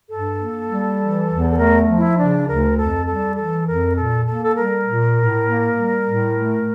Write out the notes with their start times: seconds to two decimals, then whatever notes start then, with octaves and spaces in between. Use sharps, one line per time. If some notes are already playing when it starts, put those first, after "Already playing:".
0.09 G2 A4
0.39 A#3
0.68 G3
0.98 E3
1.28 E2
1.50 A4
1.58 A3 A#4
1.88 F3
1.97 E4
2.17 C#3 D4
2.47 D2 A#4
2.77 F2 A4
3.06 G3 A4
3.36 E3 A4
3.66 F2 A#4
3.95 A#2 A4
4.25 A#3 A4
4.44 A4
4.55 G3 A#4
4.85 A#2
5.15 A2
5.43 A#3
5.74 G3
6.04 A2
6.33 A3